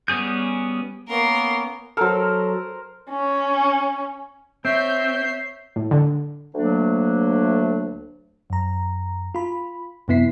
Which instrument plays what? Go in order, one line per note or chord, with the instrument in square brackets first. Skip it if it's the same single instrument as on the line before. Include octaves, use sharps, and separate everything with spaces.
[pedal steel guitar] G3 B3 C#4 G#4 G6
[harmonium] A#3 B3 C#4 [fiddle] A#4 C6
[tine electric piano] F#3 A4 [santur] A#4 C5
[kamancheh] C#4
[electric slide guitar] C4 [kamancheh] C#5 E5 [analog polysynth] G6 [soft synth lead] C7
[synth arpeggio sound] A2
D3
[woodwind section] D2 F#3 A3 A#3 D4
[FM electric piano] F#2 A#5
F4 B5
F#2 C3 B3 E4 B6 C7